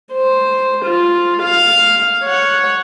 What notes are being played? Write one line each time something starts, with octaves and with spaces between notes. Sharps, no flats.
C5
F4
F5
C#5 F#5